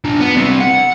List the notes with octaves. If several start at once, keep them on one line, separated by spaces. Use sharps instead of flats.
D4 F4
B3
G3 C4
F#5